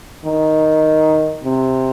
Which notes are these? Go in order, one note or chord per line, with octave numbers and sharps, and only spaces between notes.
D#3
C3